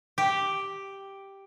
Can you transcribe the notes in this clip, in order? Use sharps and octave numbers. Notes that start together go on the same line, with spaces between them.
G4